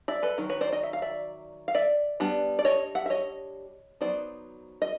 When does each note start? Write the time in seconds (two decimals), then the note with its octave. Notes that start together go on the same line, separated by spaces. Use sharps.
0.08 D5 E5
0.23 A4 B4
0.38 D#3 F#3
0.49 B4 C#5
0.61 C5 D5
0.72 C#5 D#5
0.83 E5
0.93 F5
1.02 D5 E5
1.68 F5
1.75 D5 E5
2.20 G3 B3 D4
2.59 D5
2.65 C#5 D#5
2.95 E5 F#5
3.06 E5
3.10 C#5 D#5
4.01 F#3 B3 D#4 C5 D5
4.82 D#5